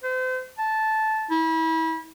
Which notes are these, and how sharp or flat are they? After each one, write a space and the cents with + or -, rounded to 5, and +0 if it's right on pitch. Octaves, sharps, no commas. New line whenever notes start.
C5 -35
A5 -10
E4 -30